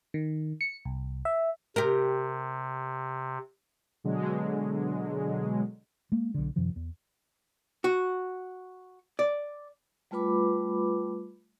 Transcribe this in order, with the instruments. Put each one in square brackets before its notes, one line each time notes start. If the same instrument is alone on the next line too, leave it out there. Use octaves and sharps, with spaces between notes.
[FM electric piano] D#3
C#7
C2
E5
[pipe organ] C3 [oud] G4 A#4
[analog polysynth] B2 D3 F#3 G#3
[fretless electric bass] G#3 A#3
B1 D3
F#2 C3 D#3 F3
E2
[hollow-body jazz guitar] F#4
D5
[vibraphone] G3 A3 F4 B4 B5 D6